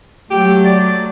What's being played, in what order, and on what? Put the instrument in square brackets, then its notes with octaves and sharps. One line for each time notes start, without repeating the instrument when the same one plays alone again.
[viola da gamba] F#3 A3 [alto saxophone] G4
[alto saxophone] D5